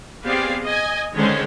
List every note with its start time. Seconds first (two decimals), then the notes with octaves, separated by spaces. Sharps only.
0.25 B3 C4 G4 G#4 D5 F5
0.66 D#5 G#5
1.15 D3 D#3 G#3 C#4 C5 C#5